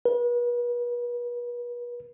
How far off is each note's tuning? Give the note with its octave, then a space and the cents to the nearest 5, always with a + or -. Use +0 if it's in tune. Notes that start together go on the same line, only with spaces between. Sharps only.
B4 -40